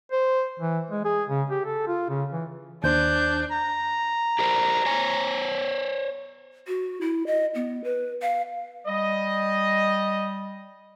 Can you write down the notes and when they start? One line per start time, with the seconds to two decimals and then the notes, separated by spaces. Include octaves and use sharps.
0.12 C5
0.60 E3
0.91 G#3
1.05 G#4
1.30 C#3
1.50 G4
1.66 A4
1.87 F4
2.09 C#3
2.32 E3
2.84 D#2 D4 C5 G6
3.52 A#5
4.39 G4 A#4 C5
4.86 C5 C#5 G#5
6.67 F#4
7.01 E4
7.27 D#5
7.55 B3
7.84 B4
8.22 F5
8.87 G3 D#5